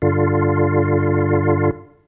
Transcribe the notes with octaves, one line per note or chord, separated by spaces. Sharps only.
G2 D3 F4